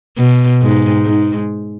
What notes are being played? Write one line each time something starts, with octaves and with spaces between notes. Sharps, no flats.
B2
G#2
G#2